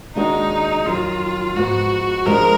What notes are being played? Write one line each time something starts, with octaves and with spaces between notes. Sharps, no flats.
D#2 D#3 G#3 D4 D#4 F#4
F2 D#3 F#3 F4
G#2 F3 B3 F#4
F3 G#3 B3 D4 A#4